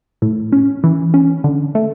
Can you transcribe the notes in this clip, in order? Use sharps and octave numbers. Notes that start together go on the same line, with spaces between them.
A2
C#4
E3
C#4
D3
A3